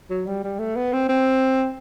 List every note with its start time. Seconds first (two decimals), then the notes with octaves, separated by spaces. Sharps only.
0.10 F#3
0.26 G3
0.44 G3
0.59 A3
0.76 B3
0.93 C4
1.09 C4